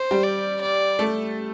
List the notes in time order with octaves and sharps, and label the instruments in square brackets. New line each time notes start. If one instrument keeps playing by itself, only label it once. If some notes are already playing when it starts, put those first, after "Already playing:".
Already playing: [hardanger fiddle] C5
[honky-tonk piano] G3 G4
[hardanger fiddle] D5
D5
[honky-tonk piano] A3 A4